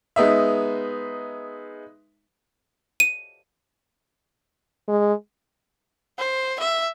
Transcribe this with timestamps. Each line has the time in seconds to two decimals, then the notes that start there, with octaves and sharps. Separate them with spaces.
0.16 G#3 B3 D#4 E5
3.00 D#7
4.88 G#3
6.19 C5
6.60 E5